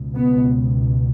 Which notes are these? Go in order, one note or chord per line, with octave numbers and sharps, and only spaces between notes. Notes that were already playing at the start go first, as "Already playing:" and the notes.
Already playing: C#2 B2
B3